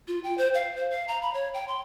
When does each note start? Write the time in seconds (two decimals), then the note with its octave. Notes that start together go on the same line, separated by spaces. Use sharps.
0.08 F4
0.24 G5
0.38 C5
0.54 F5
0.76 C5
0.91 F5
1.08 A#5
1.22 B5
1.34 C#5
1.54 G5
1.68 C6